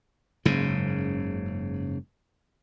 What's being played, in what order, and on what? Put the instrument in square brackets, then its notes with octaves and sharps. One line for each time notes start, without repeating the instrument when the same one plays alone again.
[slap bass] F#1 G#2 C#3